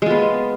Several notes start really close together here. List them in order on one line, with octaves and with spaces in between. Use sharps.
G#3 F4 B3